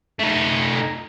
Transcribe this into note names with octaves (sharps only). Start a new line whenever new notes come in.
A3 D#4